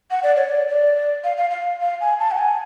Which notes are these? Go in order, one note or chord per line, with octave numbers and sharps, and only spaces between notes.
F#5
D5
C#5
D5
D5
F5
F5
F5
F5
G#5
A5
F#5
G#5